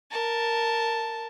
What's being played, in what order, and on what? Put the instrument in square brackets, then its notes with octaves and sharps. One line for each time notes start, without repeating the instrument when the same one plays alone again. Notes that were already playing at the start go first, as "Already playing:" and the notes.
[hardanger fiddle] A#4 A5